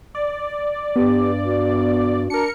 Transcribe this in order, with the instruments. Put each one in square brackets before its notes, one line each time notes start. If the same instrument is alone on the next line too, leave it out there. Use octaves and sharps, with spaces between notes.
[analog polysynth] D5
[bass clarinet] G2 [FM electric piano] B3 [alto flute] G4
[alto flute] F#4
[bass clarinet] D4 [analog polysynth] A#4 C#7